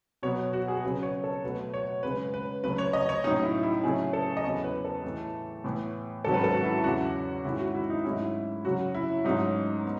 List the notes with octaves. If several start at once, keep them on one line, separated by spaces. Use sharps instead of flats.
B2 F#3 B3 C#5
F#4
G#4
C#3 F#3 C#4 B4
C#5
A4
B2 F#3 A3 B4
C#5
F#2 C#3 G#3 B4
B4
F#2 C#3 F#3 A3 C#4 B4
C#5
D#5
C#5
A2 F#3 C#4 D#4
E4
E4
C#3 F#3 A3 C#4 G#4
A4
D#5
E2 C#3 F#3 B3 C#5
B4
A4
A2 E3 A3
A2 E3 B3
G#2 D#3 F#3 C#4 A4
B4
A4
F#4
E4
F#4
E2 C#3 F#3 C#4 F#4
G#2 D#3 G#3 C#4 E4
F#4
E4
D#4
G#2 F#3 A3 C#4 E4
F#2 C#3 F#3 F#4
E4
G#2 F#3 A3 C#4 D#4
B3